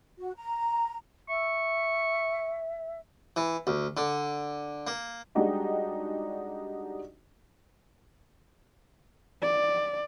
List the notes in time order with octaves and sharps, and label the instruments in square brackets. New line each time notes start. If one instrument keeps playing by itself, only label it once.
[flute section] F#4
A#5
[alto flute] E5 [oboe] C#6
[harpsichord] E3
D2
D3
A#3
[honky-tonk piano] G3 G#3 D4 D#4 F#4 G4
[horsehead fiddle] D5